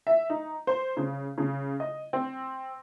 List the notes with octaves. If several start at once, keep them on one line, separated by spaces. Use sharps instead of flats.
E5
D#4
C5
C#3
C#3
D#5
C4